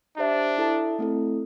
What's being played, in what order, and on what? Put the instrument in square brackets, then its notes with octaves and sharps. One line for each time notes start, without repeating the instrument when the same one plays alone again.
[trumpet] D4 [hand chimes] G4 C5 E5
[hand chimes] E4 A4 E5 A5
A3 C4 E4 A4